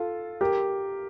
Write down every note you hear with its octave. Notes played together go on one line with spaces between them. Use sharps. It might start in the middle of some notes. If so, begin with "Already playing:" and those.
Already playing: F4 A4
G4 A#4